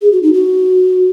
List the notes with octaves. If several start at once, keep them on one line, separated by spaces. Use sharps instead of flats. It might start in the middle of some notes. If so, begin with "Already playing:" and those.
G#4
F#4
D#4
F#4